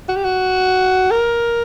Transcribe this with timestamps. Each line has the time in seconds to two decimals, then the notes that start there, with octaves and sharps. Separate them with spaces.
0.09 F#4
0.16 G4
0.24 F#4
1.11 A#4